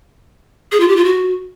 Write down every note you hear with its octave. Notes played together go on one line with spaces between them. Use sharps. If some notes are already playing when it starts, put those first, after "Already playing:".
G#4
F4
G4
F4
F#4